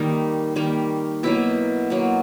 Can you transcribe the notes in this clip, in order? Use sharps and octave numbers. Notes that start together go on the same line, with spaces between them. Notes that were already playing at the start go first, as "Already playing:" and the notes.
Already playing: D#3 G3 A#3 D#4
D#3 G3 A#3
B2 F#3 A#3 E4
B2 F#3 A#3